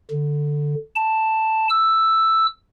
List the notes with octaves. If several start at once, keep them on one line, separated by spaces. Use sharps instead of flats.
D3
A5
E6